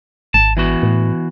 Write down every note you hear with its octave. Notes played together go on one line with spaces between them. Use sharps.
G#1 A5
E3 B3 F#4
A2